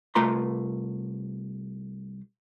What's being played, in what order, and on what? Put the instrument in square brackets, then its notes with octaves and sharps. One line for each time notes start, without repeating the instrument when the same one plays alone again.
[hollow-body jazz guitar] C2 A3 F4 B4 A#5 C6